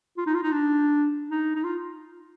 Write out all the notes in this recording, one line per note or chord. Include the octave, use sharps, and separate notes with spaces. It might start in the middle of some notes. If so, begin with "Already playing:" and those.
F4
D#4
F4
D#4
D4
D#4
D#4
F4